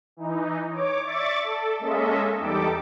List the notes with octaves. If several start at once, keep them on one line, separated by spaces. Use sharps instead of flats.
E3 D#4
C#5 D6
D5 E5 C#6 D6 A6
A4
G#3 A#3 C#4 A4 D#5 E5
E2 G3 D#4 G4 A4 D6